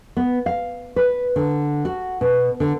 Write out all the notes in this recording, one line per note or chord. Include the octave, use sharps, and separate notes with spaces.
B3
F5
B4
D3
F#4
B2
D3